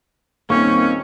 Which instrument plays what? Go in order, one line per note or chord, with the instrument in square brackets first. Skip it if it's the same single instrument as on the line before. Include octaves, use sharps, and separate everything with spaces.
[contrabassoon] D#1 [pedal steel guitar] A#3 C4 D#4 [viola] C#4 [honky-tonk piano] C#6